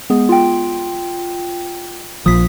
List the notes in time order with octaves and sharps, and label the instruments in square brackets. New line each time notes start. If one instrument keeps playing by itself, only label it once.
[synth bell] G#3 B3 G#4
F4 G5
[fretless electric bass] A#1 F3 [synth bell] D#6 B6